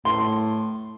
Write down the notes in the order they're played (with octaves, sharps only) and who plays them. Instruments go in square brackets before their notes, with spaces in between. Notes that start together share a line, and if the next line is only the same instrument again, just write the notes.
[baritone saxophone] A2 [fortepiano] C6